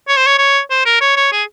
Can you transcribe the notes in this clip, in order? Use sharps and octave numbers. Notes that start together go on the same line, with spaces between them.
C#5
C5
C#5
C#5
C5
A#4
C#5
C#5
G#4